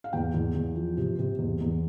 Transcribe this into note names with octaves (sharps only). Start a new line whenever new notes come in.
F5
E2 G5
E2
E2
F3
C3
C3
E2
E2